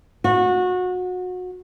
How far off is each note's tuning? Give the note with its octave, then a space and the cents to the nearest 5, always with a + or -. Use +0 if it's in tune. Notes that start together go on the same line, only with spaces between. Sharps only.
F#4 -25